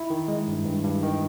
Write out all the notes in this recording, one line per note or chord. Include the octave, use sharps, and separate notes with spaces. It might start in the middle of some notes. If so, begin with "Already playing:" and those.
Already playing: E4
D#3
G#3
G2
G2
G2
D#3